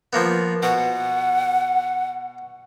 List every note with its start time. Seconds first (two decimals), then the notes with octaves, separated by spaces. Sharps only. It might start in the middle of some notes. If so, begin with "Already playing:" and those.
0.13 F3 A#3 B3
0.63 B2 F#5